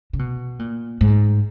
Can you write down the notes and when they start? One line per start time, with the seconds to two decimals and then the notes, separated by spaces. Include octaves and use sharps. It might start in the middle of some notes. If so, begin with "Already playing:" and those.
0.13 C#3
0.19 B2
0.59 A#2
1.01 G#2